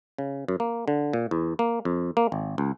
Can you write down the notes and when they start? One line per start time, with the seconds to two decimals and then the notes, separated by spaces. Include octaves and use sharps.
0.18 C#3
0.48 F#2
0.60 A#3
0.88 D3
1.13 A#2
1.31 E2
1.59 A#3
1.85 F2
2.17 A#3
2.32 G#1
2.58 C#2